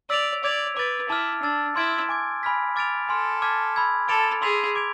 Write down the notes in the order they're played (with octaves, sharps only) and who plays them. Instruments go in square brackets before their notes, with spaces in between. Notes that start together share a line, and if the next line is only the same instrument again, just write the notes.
[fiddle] D5 [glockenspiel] E6 B6 D7 F7
[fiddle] D5 [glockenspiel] D6 G#6 D7 F7
[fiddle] B4 [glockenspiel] D6 A6 D7
[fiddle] E4 [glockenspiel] A5 D6 F6
[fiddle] D4 [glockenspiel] A5 E6 A6
[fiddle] E4 [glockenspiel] C6 F6 G#6 D7
[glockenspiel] G#5 D6 G#6
G#5 B5 F6 G#6 B6
D6 F6 A6 D7 F7
[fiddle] A4 [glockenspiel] G#5 C6 F6
[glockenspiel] A5 D6 F6 G#6 B6
B5 E6 G#6
[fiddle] A4 [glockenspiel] B5 D6 A6 D7 F7
[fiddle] G#4 [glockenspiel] C6 E6 B6 F7
[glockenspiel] D6 G#6 D7 F7